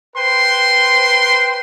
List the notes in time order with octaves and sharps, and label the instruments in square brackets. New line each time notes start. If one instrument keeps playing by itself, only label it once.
[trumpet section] B4 C5 G5 C6